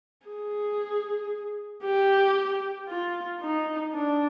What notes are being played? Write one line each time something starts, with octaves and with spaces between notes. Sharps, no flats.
G#4
G4
F4
D#4
D4